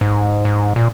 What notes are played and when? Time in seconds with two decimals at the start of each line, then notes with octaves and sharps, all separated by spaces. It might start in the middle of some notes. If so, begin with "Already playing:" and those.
0.01 G#2
0.45 G#2
0.76 A#2